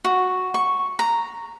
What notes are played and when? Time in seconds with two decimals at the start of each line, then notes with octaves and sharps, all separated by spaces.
0.04 F#4
0.54 C#6
0.99 A#5